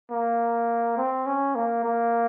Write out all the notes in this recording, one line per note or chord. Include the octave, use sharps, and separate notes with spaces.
A#3
C4
C#4
A#3
A#3